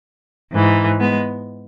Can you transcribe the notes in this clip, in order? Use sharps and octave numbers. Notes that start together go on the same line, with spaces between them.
G#2 E3
G#3 B3